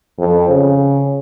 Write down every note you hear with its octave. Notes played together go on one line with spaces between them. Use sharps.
F2
C#3